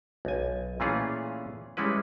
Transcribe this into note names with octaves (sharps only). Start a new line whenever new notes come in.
B1 G#5
A#2 E3 A3 C#4 F4 G#4
G3 G#3 C#4 E4 B4